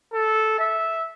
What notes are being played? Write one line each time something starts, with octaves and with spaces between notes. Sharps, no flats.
A4
E5